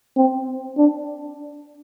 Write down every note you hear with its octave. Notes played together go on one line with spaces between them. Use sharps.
C4
D4